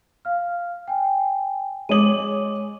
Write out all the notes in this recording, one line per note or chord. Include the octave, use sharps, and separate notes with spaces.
F5 F6
G5 G#5
G#3 C#5 D6 D#6 D#7 F#7